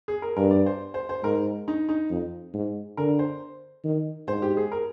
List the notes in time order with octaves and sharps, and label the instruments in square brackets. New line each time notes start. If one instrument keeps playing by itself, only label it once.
[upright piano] G#4
A#4
[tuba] G2 [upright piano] A#4
[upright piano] D5
C5
C5
C5
[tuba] G#2 [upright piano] A#4
[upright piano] D#4
D#4
[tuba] F2
G#2
[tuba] D3 [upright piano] A#4
[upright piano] C5
[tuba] D#3
[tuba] G#2 [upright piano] C5
[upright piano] G4
G#4
A#4